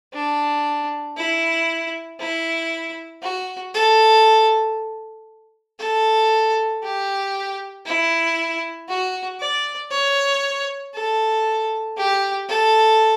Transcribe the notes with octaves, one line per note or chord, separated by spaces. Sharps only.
D4
E4
E4
F#4
A4
A4
G4
E4
F#4
D5
C#5
A4
G4
A4